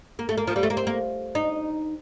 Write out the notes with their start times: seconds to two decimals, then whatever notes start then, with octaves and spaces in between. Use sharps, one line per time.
0.19 A#3
0.29 A3
0.38 A#3
0.47 F3
0.56 G3
0.63 A3
0.70 A#3
0.77 C4
0.87 A#3
1.35 D#4